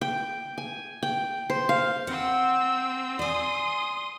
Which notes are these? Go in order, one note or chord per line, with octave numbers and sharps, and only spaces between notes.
G5
G#5
G5
C5
F5
C4 F#5 E6
D5 G#5 C6 D#6